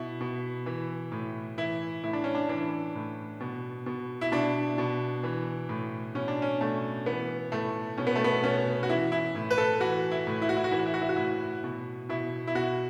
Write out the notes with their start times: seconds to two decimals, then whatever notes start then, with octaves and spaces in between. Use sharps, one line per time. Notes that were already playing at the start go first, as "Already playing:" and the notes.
Already playing: B2 E4
0.21 B2
0.66 E3
1.12 A2
1.58 E3 E4
2.03 A2 E4
2.13 D4
2.24 C#4
2.35 D4
2.49 E3 D4
2.95 A2
3.40 B2
3.86 B2
4.21 E4
4.32 B2 D4
4.78 B2
5.23 E3
5.69 A2
6.15 B2 C#4
6.28 D4
6.42 C#4
6.61 B2 A3
7.06 E3 B3
7.52 A2 A3
7.98 B2 C#4
8.07 B3
8.15 A3
8.24 B3
8.43 B2 C#4
8.83 F#4
8.89 E3 E4
9.12 E4
9.35 A2
9.51 B4
9.58 A4
9.81 E3 F#4
10.11 E4
10.27 A2
10.42 E4
10.49 F#4
10.57 E4
10.64 F#4
10.71 E3 E4
10.79 F#4
10.86 E4
10.94 F#4
11.01 E4
11.09 F#4
11.16 A2 E4
11.64 B2
12.09 B2 E4
12.47 E4
12.55 B2 F#4